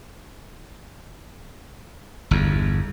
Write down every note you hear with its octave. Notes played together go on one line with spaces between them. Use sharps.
G1 E2